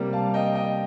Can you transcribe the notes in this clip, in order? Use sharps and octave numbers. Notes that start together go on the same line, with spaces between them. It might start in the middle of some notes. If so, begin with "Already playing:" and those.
Already playing: C3 G3 A#3
F5 A5
D#5 G5
D#5 G5